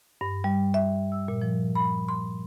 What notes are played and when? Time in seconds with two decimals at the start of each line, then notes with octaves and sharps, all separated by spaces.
0.21 G2
0.44 G3
0.74 E5
1.12 E6
1.28 A#2
1.42 F3
1.75 B5
2.09 C6